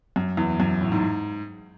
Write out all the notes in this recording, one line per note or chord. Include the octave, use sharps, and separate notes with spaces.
F#2
E2
F#2
A2
G#2